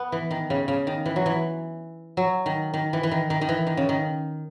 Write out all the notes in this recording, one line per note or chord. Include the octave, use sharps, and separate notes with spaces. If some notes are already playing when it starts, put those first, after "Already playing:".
Already playing: B3
E3
D#3
C#3
C#3
D#3
E3
F#3
E3
F#3
D#3
D#3
E3
E3
D#3
D#3
D#3
E3
D#3
C#3
D#3